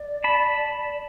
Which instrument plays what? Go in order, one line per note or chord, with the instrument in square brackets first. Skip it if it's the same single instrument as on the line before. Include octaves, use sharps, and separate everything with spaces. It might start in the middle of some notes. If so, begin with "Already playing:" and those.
Already playing: [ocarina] D5
[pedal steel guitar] A5 B5